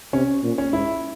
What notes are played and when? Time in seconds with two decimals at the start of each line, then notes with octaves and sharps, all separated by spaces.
0.13 C3 C#4
0.43 A#2
0.58 C#4
0.72 G#2 E4